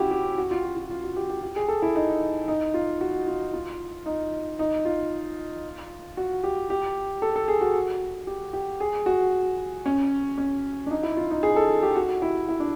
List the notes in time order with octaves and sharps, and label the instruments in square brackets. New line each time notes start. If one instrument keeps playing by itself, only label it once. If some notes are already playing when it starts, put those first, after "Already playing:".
Already playing: [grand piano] C#4 E4 F#4 G4
G4
F#4
F4
F#4
F4
F4
F#4
G4
G4
G4
G#4
A4
E4
D#4
D#4
F4
F#4
F4
F4
D#4
D#4
F4
F#4
G4
G4
A4
A4
G#4
F#4
G4
G4
G#4
F#4
C#4
C#4
D4
D#4
E4
F4
D#4
G#4
A4
G4
F#4
E4
E4
D4